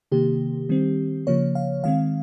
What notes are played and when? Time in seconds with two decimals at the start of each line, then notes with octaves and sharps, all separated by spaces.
0.12 C3 D#3 A#3 G4
0.69 D#3 G3 C4
1.27 C#3 F3 A#3 C#5
1.55 F5
1.84 D#3 G#3 C4 F5